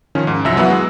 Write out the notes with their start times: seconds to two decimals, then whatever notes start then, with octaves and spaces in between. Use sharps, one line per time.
0.15 D#3 F3 C#4
0.27 G#2
0.44 C2 F#2 F3 E5 E6 A#6
0.56 E3 F#3 B3 B4 F#5
0.70 G#3